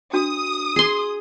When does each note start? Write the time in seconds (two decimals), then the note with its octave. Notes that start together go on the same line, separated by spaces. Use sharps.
0.13 D4 F#4 D#6
0.76 G#4 C6